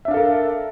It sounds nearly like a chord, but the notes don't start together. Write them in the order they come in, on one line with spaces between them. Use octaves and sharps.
E5 D4 F5 A4 A#4